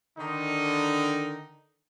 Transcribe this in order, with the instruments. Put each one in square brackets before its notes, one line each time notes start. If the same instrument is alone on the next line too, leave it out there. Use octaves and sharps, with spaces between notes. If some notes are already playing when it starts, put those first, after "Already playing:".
[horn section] D3 D#3 D#4